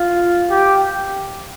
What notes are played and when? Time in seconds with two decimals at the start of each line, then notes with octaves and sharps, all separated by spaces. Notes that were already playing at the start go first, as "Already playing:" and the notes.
Already playing: F4
0.50 G4